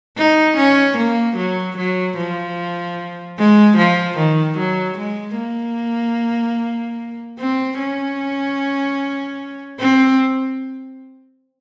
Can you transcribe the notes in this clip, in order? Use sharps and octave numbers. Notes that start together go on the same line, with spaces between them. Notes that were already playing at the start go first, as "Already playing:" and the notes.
D#4
C#4
A#3
F#3
F#3
F3
G#3
F3
D#3
F#3
G#3
A#3
C4
C#4
C4